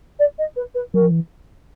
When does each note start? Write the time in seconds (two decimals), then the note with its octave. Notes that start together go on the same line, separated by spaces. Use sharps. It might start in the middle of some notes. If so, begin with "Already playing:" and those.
0.19 D5
0.38 D#5
0.56 B4
0.74 B4
0.94 F#3 A#4
1.02 F3
1.11 E3